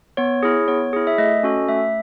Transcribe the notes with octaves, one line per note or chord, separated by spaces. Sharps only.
B3 C#5
E4 G#4
B3 C#5
E4 G#4
E5
A3 D#5
C#4 F#4 A4
A3 E5